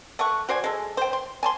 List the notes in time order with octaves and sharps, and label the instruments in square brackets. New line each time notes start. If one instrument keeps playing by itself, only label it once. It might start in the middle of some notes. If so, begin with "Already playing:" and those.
[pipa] A3 F#5 C#6
F#4 C5 D5 G#5
G#3 A4
C5 G5
C6
G#5 A5 C6